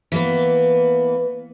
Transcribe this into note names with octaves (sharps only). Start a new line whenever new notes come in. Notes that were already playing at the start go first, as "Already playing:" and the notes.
E3 A#3 B3